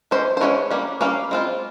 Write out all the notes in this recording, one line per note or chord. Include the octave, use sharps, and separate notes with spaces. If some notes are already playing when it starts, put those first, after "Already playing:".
E3 G#3 C#4 C5
C5
E3 G#3 C#4 E4 C#5
G3 A#3 C#4
G3 A#3 C#4 F5
G#3 C4 F4